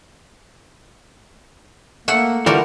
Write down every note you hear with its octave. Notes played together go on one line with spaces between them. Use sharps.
A3 A#3 F#5
D3 E3 G3 F4 F#4 A#4